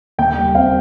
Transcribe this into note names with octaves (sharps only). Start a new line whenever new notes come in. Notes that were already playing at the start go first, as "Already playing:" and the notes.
D#2 G5
G3
C4 F5